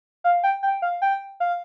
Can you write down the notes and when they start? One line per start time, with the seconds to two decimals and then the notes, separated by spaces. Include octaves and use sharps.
0.24 F5
0.44 G5
0.63 G5
0.82 F5
1.02 G5
1.40 F5